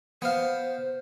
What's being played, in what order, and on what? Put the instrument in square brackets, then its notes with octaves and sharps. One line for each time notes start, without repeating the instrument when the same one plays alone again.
[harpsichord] B3 F5 [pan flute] C5